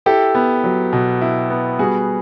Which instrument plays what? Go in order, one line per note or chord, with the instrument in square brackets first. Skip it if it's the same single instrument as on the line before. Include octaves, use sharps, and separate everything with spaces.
[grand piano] E4 G4 A4
B3
F#3
B2
E4
B3
G3 F#4 G#4